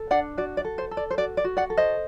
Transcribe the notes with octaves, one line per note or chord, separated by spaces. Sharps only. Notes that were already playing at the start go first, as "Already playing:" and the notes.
Already playing: A4
D4 D5 F#5
F#4 D5
D5
A4
C5
A4
D5
C5
F#4 D5
D5
F#4
D5 F#5
A4
C5 D#5